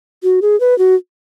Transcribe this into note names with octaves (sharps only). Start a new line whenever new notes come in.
F#4
G#4
B4
F#4